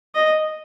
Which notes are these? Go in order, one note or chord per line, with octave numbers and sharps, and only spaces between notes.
D#5